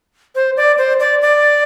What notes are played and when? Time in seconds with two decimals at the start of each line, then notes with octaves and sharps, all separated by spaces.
0.35 C5
0.57 D5
0.78 C5
1.00 D5
1.22 D5